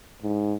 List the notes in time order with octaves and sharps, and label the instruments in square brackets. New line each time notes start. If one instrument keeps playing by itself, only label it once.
[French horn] G#2